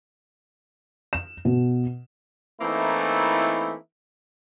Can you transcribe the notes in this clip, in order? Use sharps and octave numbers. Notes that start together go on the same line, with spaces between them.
E7
B2
E3 A3 A#3 C4 D#4 E4